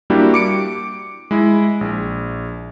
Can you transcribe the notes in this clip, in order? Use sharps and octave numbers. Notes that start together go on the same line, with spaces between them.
G3 A#3 D4 E4 F#4 G4
D6 C#7 D7
G#3 E4
A#1